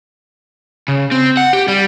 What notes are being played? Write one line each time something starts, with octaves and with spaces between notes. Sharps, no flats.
C#3
C4
F#5
G4
G3